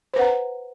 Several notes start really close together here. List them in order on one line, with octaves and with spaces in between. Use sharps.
C5 B4 F#5 A#5